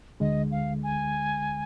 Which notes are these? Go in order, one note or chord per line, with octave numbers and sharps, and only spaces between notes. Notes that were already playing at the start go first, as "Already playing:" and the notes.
D2 D3 G#3 D#5
F5
G#5